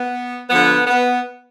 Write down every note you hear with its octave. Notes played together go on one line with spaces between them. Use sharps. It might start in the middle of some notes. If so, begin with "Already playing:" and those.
Already playing: B3
D3 F3 B3
B3